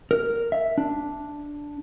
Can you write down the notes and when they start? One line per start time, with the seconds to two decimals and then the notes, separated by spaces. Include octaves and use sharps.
0.11 A#4
0.52 E5
0.78 D4